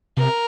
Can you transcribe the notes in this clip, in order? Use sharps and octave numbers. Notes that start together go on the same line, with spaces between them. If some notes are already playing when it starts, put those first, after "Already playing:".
C3 A#4